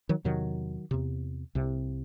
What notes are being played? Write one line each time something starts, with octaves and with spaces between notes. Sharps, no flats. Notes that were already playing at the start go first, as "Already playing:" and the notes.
D#3 F#3
E2 C3 D#3 F#3
E2 C3
C2 C3